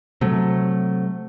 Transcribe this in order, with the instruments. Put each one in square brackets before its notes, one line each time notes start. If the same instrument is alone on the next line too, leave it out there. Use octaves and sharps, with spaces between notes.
[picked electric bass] C3 F#3 A3